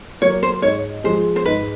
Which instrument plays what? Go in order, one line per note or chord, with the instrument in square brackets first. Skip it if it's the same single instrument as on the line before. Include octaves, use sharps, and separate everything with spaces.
[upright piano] F#3 A#3 [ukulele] C#5
[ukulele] C5
[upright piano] G#2 [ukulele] C#5
[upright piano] F3 G#3 [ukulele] C5
[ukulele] C5
[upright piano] G#2 [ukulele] B4